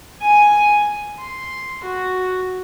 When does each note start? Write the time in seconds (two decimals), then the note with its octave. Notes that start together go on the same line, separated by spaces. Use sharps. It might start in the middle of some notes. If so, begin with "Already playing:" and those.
0.22 G#5
1.20 C6
1.84 F#4